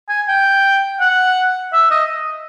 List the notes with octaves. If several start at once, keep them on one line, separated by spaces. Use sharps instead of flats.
G#5
G5
F#5
E5
D#5